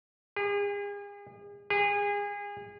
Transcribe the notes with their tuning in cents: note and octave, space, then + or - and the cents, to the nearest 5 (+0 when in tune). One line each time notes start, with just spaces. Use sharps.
G#4 -40
G#4 -30